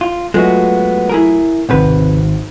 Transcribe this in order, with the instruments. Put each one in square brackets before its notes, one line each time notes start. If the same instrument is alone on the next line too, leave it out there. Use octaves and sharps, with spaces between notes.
[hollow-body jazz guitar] F4
[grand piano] F#3 A3 F4 [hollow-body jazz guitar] G#3 B3 F#4
[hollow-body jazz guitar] E4 G#4 A#4
[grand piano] G#1 F#5 [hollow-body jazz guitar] C#2 C3 B4